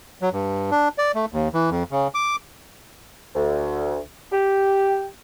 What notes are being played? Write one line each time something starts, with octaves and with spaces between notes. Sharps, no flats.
F#3
G2
D4
D5
A3
D#2
E3
F2
C#3
D6
D2
G4